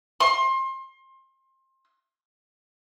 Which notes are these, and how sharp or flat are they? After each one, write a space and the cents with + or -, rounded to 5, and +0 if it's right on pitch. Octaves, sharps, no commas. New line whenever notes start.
C6 +30